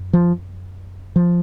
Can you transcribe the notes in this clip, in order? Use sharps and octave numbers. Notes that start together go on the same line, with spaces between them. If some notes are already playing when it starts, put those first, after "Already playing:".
Already playing: F#2
F3
F3